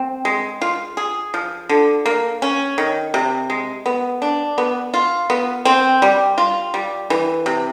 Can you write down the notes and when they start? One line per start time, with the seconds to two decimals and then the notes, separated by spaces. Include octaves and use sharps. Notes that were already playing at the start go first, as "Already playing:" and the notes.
Already playing: C4
0.25 G#3
0.61 F4
0.97 G#4
1.34 F3
1.69 D3
2.06 A#3
2.42 C#4
2.78 D#3
3.14 C3
3.50 G#3
3.86 B3
4.22 D4
4.58 B3
4.94 F4
5.30 B3
5.65 C4
6.02 G3
6.38 F4
6.74 G3
7.10 E3
7.46 C3